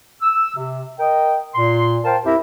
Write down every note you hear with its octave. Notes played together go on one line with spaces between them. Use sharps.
E6
C3
A#4 D#5 G5
A#2 C6
A#4 C5 F5 G5 A5
F2 E4 G4 A#4 E5